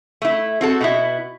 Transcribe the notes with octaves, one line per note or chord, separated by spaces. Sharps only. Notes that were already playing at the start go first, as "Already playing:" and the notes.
A3 E4
C4 F#4 A4
B2 B3 E4